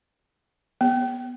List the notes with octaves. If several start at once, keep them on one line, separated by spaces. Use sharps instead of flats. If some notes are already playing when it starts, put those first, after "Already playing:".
B3